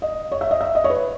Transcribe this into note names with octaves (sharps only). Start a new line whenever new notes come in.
D#5
C#5
E5
D#5
E5
D#5
C#5
B4